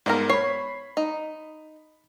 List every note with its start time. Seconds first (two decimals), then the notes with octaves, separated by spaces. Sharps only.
0.06 G#2 G3 A#3 B3 A#4
0.30 C#5 B5 C7
0.97 D#4